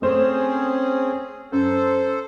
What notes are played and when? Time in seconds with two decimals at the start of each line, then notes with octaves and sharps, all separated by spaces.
0.02 A3 C4 C#4 G#4 C5
1.52 F#2 A4 C5